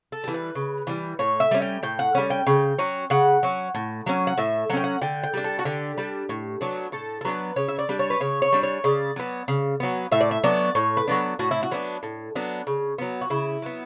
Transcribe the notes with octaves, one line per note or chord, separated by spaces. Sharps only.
A4
E3 G3
B4
C#3
E3 G3
A2 C#5
E5
G3 C#4
G5
A2 G5
F#5
G3 C#4
G5
C#3
F#3 C#4
C#3 F#5
F#3 C#4
A2
F#3 C#4
F#5
A2 E5
F#3 C#4 F#5 G5
F#5
D3 G5
G5
G3 D4
A4
F#4
D3 G4
G3 D4
A2
F#3 B3 D4
A2 A4
A4
F#3 B3 D4 B4
C#3 C#5
E5
D5
G3 D4
C#5
B4
C#3 C#5
C#5
G3 D4
C#5
C#3 D5
F#3 B3
C#3
F#3 B3
A2 E5
D5
E5
F#3 B3 D4 D5
A2 C#5
B4
F#3 B3 D4
A2 F#4
E4
F#4
F#3 B3 D4
A2
F#3 B3 D4
C#3
F#3 B3
F#4
C#3 E4
F#3 B3